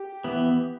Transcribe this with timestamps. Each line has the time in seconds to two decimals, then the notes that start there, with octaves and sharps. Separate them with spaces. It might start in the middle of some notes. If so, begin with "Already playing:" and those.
Already playing: G4
0.24 E3 B3